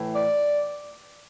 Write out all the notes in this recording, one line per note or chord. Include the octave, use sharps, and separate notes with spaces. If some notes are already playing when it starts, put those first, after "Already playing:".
Already playing: A2 E3
D5